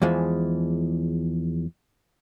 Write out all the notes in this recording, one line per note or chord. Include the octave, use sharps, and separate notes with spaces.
E2 E3 F3 G#3